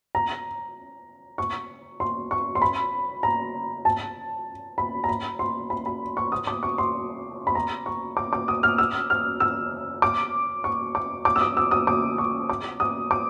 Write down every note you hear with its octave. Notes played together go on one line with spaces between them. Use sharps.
A#5
C#6
C6
C#6
C6
B5
A#5
A5
B5
A#5
B5
C6
B5
B5
C#6
D#6
D6
C#6
C6
B5
A#5
C#6
D6
D6
D#6
F6
E6
F6
E6
D6
C#6
D6
D6
E6
D#6
E6
D#6
D6
C#6
D6
D#6
D6